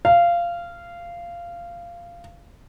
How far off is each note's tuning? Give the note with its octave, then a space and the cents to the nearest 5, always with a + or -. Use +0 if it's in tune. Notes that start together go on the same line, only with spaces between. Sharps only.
F5 -15